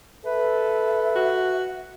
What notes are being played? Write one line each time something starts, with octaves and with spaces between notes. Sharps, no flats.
A4 B4 E5
F#4